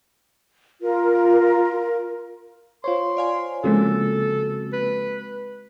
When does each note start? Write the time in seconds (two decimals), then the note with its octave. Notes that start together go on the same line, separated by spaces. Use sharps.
0.81 F4 A#4
2.84 F4 C5 C#5 C6
3.17 D5 F5 G#5
3.64 C#3 F3 G#3 A#3 C4 F#4 A4
4.73 B4